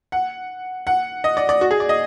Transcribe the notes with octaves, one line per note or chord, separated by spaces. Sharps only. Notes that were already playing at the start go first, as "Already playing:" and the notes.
F#5
F#5
D#5
D5
D5
F#4
G#4
D5
D#5